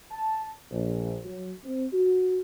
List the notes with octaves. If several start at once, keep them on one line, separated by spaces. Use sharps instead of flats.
A5
A#1
F#3
C4
F#4